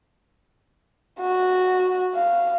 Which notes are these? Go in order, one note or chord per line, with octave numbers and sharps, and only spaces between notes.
F#4
F5